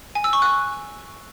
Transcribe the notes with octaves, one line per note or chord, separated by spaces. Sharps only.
G#5
E6
C#6
F#6